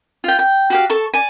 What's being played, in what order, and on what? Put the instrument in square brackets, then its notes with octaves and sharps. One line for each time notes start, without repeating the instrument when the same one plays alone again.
[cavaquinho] F4 G5
G5
F#4 G4 F5
A4 A5 C#6
D5 G#5